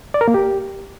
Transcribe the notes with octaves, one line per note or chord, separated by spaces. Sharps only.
D5
A#4
A#3
G4